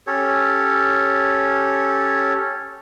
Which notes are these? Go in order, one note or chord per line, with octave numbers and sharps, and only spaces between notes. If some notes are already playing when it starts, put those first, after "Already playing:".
C#4 G4 A4 C#5